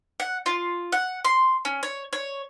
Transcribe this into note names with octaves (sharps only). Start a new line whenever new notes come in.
F#5
F4
F#5
C6
C#4
C#5
C#5